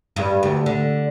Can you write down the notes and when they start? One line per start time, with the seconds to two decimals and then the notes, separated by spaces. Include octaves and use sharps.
0.16 G2
0.43 D2
0.66 D3